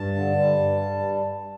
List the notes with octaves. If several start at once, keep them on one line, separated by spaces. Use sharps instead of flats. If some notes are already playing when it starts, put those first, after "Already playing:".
Already playing: G2 A5
D3
G3
G2
G3